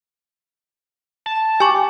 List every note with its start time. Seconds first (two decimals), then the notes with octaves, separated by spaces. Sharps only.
1.26 A5
1.60 G4 G#5 C#6